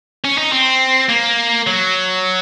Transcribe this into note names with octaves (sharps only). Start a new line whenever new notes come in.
C#4
D#4
C4
A#3
F#3